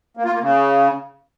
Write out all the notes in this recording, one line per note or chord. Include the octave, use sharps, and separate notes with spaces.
A#3
F4
A#3
C#3